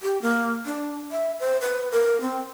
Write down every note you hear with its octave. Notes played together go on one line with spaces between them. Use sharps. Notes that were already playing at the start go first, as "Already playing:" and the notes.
G4
A#3
D4
E5
C5
B4
A#4
C4